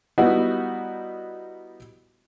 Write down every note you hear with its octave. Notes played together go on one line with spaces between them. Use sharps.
G3 B3 D#4 E4 F#4